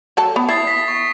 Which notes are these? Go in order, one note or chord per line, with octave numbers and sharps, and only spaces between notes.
F#3 A4 A5
B3
E4 D#6 A6 C7
B6
C#6